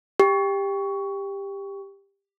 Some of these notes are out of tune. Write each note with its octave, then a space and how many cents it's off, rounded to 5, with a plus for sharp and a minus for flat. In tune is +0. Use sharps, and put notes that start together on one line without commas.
G4 +15